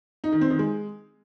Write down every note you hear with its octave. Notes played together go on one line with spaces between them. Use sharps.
D#4
D#3
C4
D#3
G#3